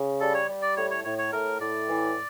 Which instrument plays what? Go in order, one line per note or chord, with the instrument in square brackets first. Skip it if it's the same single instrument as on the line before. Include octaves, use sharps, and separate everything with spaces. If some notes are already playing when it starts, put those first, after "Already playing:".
Already playing: [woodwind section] C#3
[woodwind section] G3 [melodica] A4
[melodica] C#5
[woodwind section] G3
[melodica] D5
[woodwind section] A2 [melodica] C#5
[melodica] C#5
[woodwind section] A2 [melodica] C#5
[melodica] C#5
[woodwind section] A2 [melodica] A#4
[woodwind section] A2 [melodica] D5
[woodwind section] E3